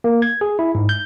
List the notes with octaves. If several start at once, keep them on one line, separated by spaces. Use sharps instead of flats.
A#3
G#6
G#4
E4
G#2
G6